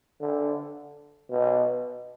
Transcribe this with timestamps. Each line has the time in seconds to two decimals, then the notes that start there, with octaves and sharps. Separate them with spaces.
0.20 D3
1.31 B2